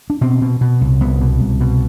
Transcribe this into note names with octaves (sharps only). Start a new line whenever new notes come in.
D4
B2 C4
B2
B2
C2
C2 B3
B2
C2
B2